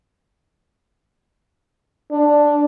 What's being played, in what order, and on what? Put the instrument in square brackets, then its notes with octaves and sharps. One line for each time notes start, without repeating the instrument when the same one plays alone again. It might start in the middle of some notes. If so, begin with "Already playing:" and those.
[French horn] D4